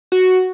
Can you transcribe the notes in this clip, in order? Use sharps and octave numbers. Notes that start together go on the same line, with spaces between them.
F#4